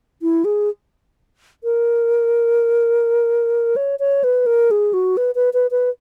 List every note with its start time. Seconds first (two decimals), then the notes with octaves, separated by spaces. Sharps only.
0.22 E4
0.45 G#4
1.64 A#4
3.76 C#5
4.00 C#5
4.24 B4
4.46 A#4
4.71 G#4
4.93 F#4
5.17 B4
5.35 B4
5.54 B4
5.71 B4